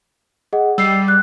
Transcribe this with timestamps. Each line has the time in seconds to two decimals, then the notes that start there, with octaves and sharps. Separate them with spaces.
0.53 G#4 D#5 F#5
0.78 G3 E6 C7
1.08 F#6